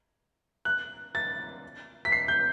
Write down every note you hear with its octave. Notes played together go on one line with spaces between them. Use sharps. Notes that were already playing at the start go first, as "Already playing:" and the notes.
F#6
A6
B6
C7
G6